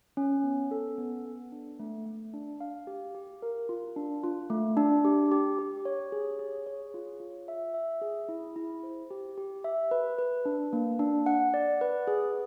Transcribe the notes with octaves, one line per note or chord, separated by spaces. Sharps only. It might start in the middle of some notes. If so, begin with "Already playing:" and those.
C#4
B3
A4
B3
B3
D4
A3
A3
D4
F5
G4
G4
A#4
F4
D4
F4
A3
D4
G4
G4
G4
C#5
G#4
G#4
C#5
F4
F4
E5
E5
G#4
E4
E4
C5
G4
G4
E5
B4
B4
D4
A#3
D4
F#5
D5
B4
G#4